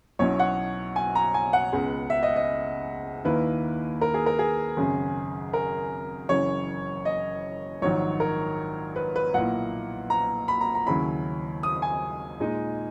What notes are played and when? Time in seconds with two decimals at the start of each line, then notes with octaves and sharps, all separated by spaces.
0.19 B1 B2 F#3 C#4 E4 C#5
0.39 F#5
0.96 G#5
1.15 A#5
1.34 G#5
1.53 F#5
1.73 C#2 C#3 G#3 B3
2.10 E5
2.23 D#5
2.36 D#5
3.25 D#2 D#3 A#3 E4 B4
4.01 A#4
4.14 G#4
4.26 A#4
4.39 G#4
4.77 G#1 F#2 C#3
5.53 A#4
6.29 F#1 F#2 C#3 E3 C#5
7.05 D#5
7.82 A#1 G#2 D#3 F#3 C#5
8.20 A#4
8.96 B4
9.16 B4
9.34 B1 A#2 A#3 E4 F#5
10.10 A#5
10.48 B5
10.61 A#5
10.75 A#5
10.86 D#2 C#3 F#3 C#4 E4 B5
11.63 D#6
11.82 G#5
12.40 A#2 G#3 D#4